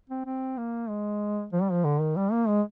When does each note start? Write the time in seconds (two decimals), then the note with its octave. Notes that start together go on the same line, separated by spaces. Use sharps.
0.10 C4
0.26 C4
0.57 A#3
0.89 G#3
1.53 F3
1.62 G3
1.72 F3
1.84 D3
2.01 D#3
2.16 G3
2.32 A#3
2.48 G#3